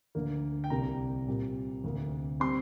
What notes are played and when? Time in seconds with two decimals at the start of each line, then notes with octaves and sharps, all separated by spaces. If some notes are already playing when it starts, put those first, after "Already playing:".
0.15 D2 D3 A#3
0.64 G5
0.70 C2 C3 A#3 A#5
1.27 A#2 G3 C4
1.84 D2 C3 A#3
2.40 G3 C4 C6